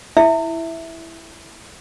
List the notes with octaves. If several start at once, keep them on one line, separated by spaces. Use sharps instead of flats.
E4 E5